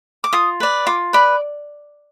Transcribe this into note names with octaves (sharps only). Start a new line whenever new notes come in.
D6
F4 D#6
B4 D5
F4 D6
B4 D5 B5